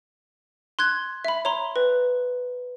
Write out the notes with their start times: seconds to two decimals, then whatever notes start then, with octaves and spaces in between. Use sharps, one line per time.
0.79 C6 F#6 G#6
1.25 E5 B5
1.45 C#5 A#5 C6
1.76 B4